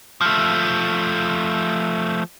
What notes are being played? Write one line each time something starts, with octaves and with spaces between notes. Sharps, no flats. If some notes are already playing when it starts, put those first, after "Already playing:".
F3 A3